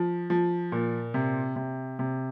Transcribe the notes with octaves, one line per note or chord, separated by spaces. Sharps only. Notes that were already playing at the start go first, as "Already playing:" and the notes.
Already playing: F3
F3
A#2
C3
C3
C3